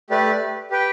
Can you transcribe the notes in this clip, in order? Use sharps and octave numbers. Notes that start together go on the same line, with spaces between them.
A3 G4 B4 D5
G4 B4 G5